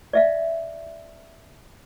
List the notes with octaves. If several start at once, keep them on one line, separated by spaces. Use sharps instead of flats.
D5 E5 F5